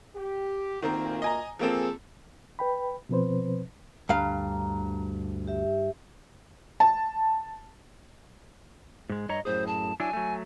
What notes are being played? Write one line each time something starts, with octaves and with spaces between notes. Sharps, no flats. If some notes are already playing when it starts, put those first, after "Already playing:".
G4
D2 A#2 D#3 A#3 C4 A#4
D#5 G#5 A#5
F3 A#3 C4 G#4 A4
B4 G5 B5
B2 F3 C4 B4 C5
D2 G2 F5 A#5
G4 E5
A5
G#2 G#3
G2 C#5 D#5 A#5
F#2 A2 G#4 C5
A5
F#3 D4 E4 G#5
F#3 A3